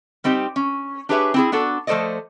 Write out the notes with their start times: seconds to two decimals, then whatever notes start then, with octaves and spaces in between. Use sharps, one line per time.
0.24 G3 C4 D#4 G4
0.56 C#4
1.09 D4 G4 G#4 B4 C#5 E5
1.34 C4 E4 G#4
1.52 B3 D4 F#4 A4
1.87 F3 A3 A4 C5 D5 D#5